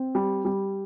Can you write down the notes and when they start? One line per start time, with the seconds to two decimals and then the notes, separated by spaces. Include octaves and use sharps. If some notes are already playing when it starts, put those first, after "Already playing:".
Already playing: C4
0.15 G3
0.45 G3